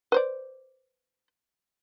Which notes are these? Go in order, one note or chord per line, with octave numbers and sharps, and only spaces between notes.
B4 C5 D5